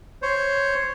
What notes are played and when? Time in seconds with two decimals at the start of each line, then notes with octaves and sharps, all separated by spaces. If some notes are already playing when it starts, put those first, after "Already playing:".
0.22 C5 C#5